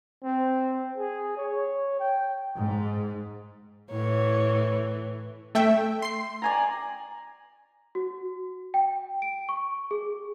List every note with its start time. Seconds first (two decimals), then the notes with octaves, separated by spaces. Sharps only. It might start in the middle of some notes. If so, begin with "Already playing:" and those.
0.24 C4
0.98 G#4
1.37 C#5
2.00 G5
2.58 G#2
3.91 A2 E3 C#5
5.55 A3 E5 G5
6.02 C6 C7
6.42 D5 G#5 A#5
7.95 F#4
8.74 G5
9.22 D7
9.49 C#6
9.91 G#4